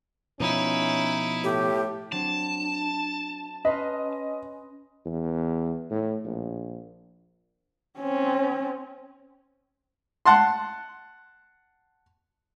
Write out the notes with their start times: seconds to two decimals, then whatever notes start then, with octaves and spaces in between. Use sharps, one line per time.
0.40 B2 F3 C#4 D#4 E4
1.44 A2 G4
2.12 F#3 C4 D4 A5
3.65 C#4 B4 D#5 C6 F6
5.06 E2
5.91 A2
6.24 A#1
7.98 C4 C#4
10.26 F#5 A5 C6